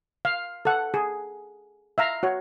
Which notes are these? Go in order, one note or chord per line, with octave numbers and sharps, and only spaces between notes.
F5
A4 F#5
G#4
E5 F5 A#5
F#4 C#5